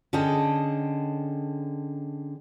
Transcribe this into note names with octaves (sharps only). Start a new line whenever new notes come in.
D3 C#4 G#4 D#5 G5 A5